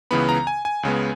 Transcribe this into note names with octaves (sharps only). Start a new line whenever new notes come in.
C#2 C#3 E3 B3 B5
A#5
G#5
G#5
C#2 C#3 G#3 B3